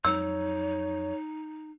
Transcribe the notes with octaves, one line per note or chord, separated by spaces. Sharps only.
F2 F#3 D#4 C#5 E6